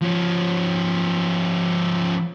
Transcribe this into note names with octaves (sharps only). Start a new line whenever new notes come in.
F3 C#4